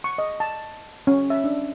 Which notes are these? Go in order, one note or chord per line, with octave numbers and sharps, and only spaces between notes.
C#6
D#5
A5
C#4
E5
D4